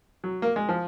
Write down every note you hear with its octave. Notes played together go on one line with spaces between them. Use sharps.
F#3
A#3
G#3
F3